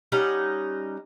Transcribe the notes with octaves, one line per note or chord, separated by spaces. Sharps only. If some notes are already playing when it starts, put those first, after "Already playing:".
G3 C#4 D#4 F#5